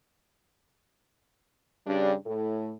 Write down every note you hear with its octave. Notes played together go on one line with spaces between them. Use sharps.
G2 C#3 G3 D4
A2 A4